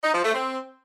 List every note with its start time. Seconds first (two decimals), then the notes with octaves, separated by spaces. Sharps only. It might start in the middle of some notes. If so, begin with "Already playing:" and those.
0.04 D#4
0.14 F3
0.24 A3
0.34 C4